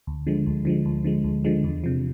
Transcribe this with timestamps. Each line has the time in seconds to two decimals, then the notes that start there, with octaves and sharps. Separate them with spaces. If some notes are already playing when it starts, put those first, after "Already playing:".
0.07 D2
0.27 D3 F3 G#3
0.47 D2
0.65 D3 F3 G#3
0.86 D2
1.04 D3 F3 G#3
1.24 D2
1.44 D3 F3 G#3
1.64 E2
1.84 C3 F3